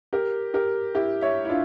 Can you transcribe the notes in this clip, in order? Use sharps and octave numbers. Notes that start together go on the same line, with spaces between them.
G4 A#4
G4 A#4
E4 G4
C#5 E5
E4
D4 F4